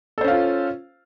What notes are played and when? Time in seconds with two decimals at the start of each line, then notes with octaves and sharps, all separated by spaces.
0.18 A4
0.21 C5
0.24 C#4
0.28 F5
0.31 F4